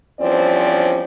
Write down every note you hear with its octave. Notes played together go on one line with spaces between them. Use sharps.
E2 G2 F3 C4 C#4 D5